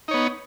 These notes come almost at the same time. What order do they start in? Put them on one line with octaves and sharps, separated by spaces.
D#4 C#5 B3